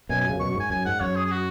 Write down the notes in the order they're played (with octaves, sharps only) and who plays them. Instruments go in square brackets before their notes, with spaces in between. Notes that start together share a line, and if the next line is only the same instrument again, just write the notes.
[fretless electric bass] F#2 B2 [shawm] G#5
[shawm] G#5
[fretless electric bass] C#3
[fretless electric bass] F#2 B2 [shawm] C#6
[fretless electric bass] G#2 [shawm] C#6
[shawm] G#5
[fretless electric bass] F#2 [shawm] G#5
[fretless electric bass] G#2 [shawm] F#5
[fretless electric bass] F#2 [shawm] C#5
[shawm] G#4
G#4
F#4